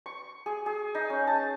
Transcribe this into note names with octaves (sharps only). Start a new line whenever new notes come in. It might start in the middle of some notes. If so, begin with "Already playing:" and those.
C#6
G#4
G#4
D#4
C#4
A5